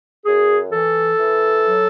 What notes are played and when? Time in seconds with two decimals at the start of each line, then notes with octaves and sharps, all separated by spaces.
0.25 F#2 G#4
0.72 E3 A4
1.19 E3
1.66 F#3